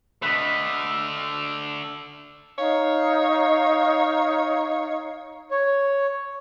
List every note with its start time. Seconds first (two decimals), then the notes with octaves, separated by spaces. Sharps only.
0.22 D3 A3 B4 D#5
2.58 D#4 C#5 F5
5.51 C#5